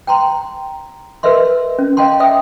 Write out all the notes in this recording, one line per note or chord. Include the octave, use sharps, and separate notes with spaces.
G5 A5 A#5 C6
A#4 B4 D#5 E5 C6
C#4
D#5 F5 G5 A5 C6
D#5 E5 G5 D#6